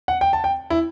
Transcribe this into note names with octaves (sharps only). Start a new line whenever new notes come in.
F#5
G5
A5
G5
E4